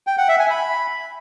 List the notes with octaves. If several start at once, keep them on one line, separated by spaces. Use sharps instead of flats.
G5
F#5
E5
G#5
B5